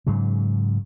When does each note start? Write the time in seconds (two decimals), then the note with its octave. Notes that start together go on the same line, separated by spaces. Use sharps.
0.07 G#2 C#3 F#3